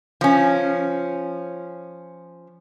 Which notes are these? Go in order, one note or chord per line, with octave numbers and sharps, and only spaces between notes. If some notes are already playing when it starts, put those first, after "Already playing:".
F3 C#4